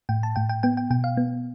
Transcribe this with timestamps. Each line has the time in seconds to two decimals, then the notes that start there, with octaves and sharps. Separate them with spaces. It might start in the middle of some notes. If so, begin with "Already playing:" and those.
0.09 A2 G5
0.23 A5
0.36 A2 G5
0.49 G5
0.63 B3 G5
0.77 G5
0.90 B2 G5
1.04 F5
1.17 B3